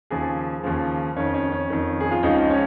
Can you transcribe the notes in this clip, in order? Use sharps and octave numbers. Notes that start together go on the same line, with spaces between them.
D#2 C#3 F3 G#4
D#2 C#3 F3
F2 D#3 C#4
C#4
C#4
F2 D#3
G#4
F4
C#2 C#3 F3 D#4
D#4
C#4